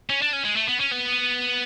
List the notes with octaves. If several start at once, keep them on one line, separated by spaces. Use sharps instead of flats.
C#4
D4
C#4
G#3
A3
B3
C#4
B3